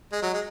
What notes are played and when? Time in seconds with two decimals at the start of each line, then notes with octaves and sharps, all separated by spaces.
0.12 G#3 D#5
0.22 F#3
0.33 G#3